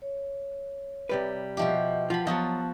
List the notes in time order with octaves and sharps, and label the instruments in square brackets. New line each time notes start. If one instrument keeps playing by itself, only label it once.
[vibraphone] C#5
[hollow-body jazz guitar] C3 G3 B4
[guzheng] B2 F3 G4 [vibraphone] D#5 E5 F#5
[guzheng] F3 B5 [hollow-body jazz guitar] F4 [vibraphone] F#5 A5
[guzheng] F3 F#4 A4 [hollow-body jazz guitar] F#3 D#5 [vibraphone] B3 A5